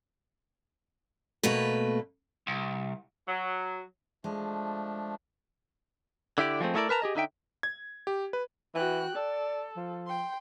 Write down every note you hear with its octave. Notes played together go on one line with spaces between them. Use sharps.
B2 A3 A#3 B4
C2
F#3
F3 G#3 A3 D4
D3 E4 G4 D5
F3 G#3 A3 C4
A3 B3 E4 A4 A#4 D5
A#4 B4 A5 A#5
G4 G#4 D#5
D3 D#4 E5 G5
G#6
G4
B4
E3 F#4 G5 F#6
A4 D5
F3
G5 C6